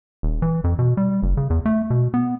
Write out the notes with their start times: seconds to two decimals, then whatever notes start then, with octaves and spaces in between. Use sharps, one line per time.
0.23 D#1
0.42 E3
0.64 F2
0.79 B2
0.97 G3
1.23 F#1
1.37 C#3
1.50 E2
1.66 A3
1.90 B2
2.14 B3